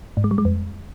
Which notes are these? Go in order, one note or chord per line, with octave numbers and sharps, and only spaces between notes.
G#2
G#3
G3
G#3
F2